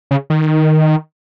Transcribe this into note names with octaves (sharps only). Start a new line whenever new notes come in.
C#3
D#3